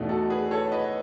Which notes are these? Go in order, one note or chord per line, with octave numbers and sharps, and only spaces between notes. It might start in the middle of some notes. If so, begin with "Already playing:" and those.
Already playing: E2 B2 A3 D#4
F#4 A4
G#4 B4
A4 C#5
B4 D#5